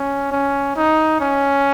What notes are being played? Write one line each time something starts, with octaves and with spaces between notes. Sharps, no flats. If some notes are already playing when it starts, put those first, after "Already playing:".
Already playing: C#4
C#4
D#4
C#4